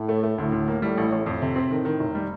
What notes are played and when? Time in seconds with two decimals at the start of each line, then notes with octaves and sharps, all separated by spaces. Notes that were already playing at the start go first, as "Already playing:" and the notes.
Already playing: A2
0.09 A3
0.23 A3
0.38 D2 A2
0.52 D2
0.68 A#3
0.82 A2 G3
0.97 A1
1.12 A1
1.26 F2 A2
1.42 C3
1.56 C4
1.70 A2 D#3
1.85 D#3
2.00 F1
2.15 G3